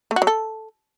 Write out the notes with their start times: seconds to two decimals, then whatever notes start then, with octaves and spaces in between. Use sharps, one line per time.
0.11 A3
0.16 F#4
0.22 F#3
0.27 A4